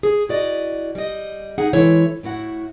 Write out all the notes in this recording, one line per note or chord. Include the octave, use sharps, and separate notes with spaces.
G#4
E4 F#4 D5 D#5
G3 D#5
D#4 G#4 F#5
E3 G#3 E4 A4 C#5
A2 E4 F#4 F#5